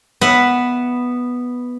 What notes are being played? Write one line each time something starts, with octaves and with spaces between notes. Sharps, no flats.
B3 E5 F#5